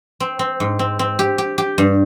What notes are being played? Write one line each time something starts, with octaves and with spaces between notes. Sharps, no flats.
C4
C4
G#2
C4
C4
G4
G4
G4
G2